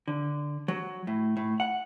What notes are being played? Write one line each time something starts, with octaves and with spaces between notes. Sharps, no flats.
D3
F#3
A2
A2
F#5